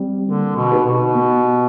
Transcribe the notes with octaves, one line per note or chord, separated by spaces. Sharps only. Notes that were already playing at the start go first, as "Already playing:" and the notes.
Already playing: G3 C4
D3 A#3
B2
D#4 G4 B4
B2
B3